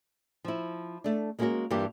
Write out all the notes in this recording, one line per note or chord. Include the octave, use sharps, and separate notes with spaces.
F3 E4
A3 D4
G#3 A#3 C#4 F4 F#4 A#4
G2 E3 A#3 F4 G4 A#4